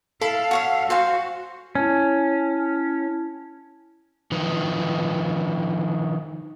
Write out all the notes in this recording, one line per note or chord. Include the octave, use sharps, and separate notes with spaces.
E4 A4 F5 A5 B5
F#4 C#5 E5
F#4 C5 F5 G#5
C#4 E4 A5
D#3 F3 D#4 B4